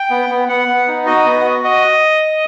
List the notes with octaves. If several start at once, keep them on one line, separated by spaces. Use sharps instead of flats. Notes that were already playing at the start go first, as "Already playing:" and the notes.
Already playing: G5
B3
B3
B3 F#5
B3
D#4
F#4 D#5
B3
F#4
D#5